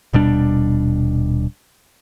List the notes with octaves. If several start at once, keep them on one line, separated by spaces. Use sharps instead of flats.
D#1 B2 G3 D4